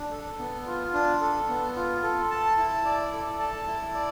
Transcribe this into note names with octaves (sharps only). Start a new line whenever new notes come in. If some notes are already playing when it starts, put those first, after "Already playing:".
Already playing: D4
A4
B3
F4
D4
A4
B3
F4
A4
A5
E4
D5
A4
A5
E4
D5